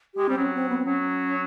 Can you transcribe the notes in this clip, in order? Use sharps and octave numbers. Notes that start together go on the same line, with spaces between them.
G#3 G4
G3 C4
F#3 C#4
C4
B3
C4
F#3 C#4